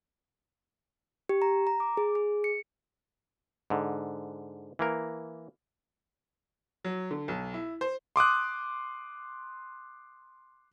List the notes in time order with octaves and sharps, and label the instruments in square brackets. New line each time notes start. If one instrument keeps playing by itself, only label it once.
[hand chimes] G4
A#5
A#5
D6
G#4
G#4
C#7
[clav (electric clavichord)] G#2 D3
E3 A#3 A#4
[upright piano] F#3
D3
B1
E4
C5
[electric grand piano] C6 D6 D#6 F#6